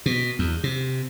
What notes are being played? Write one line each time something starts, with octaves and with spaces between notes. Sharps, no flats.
B2
E2
C3